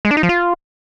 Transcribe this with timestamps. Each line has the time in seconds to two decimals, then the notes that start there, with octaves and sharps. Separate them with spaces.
0.05 G#3
0.11 D4
0.17 D#4
0.23 F3
0.29 F4